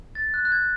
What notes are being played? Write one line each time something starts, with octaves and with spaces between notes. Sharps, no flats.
A6
F#6
F#6
G#6